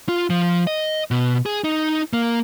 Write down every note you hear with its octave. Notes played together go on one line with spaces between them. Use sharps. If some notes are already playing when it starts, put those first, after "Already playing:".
F4
F3
D#5
B2
G#4
D#4
A#3